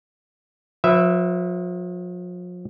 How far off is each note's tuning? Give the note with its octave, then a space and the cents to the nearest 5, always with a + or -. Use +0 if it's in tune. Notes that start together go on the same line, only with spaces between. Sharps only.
F3 +45 B4 +0 E5 +0